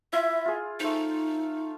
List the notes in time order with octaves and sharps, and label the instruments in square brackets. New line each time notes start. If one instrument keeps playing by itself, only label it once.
[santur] E4 F4 [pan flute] E5
[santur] F4 G#4
[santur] A3 C5 [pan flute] D#4